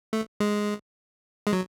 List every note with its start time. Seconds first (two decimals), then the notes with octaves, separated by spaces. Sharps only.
0.13 A3
0.40 G#3
1.47 G#3
1.53 F#3